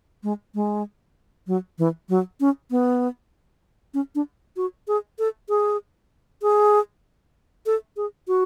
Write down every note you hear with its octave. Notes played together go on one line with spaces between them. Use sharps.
G#3
G#3
F#3
E3
F#3
C#4
B3
C#4
D4
F#4
G#4
A4
G#4
G#4
A4
G#4
F#4